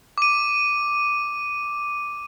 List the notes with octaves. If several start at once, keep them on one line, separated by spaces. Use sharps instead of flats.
D6 D#7